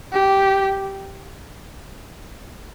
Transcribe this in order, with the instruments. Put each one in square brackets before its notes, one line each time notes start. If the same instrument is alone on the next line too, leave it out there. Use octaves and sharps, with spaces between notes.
[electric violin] G4